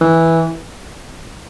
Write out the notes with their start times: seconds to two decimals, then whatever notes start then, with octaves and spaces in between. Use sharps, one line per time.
0.01 E3